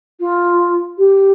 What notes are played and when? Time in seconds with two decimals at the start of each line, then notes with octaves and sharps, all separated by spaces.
0.20 F4
0.97 G4